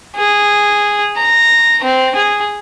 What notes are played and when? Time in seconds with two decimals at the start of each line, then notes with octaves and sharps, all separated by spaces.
0.16 G#4
1.17 A#5
1.84 C4
2.15 G#4